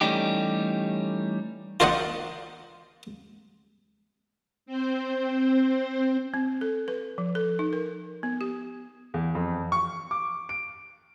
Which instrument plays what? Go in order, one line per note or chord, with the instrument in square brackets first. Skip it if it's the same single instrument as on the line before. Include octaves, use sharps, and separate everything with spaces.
[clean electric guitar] E3 G3 A3 C#4 D#4 G4
[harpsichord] F4 A#4 C5 D5 D#5 F#5
[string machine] C4 C5
[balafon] C4
A4
B4
F3
A4
D#4
A#4
B3
G4
[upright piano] E2
F2
C#6
D6
D7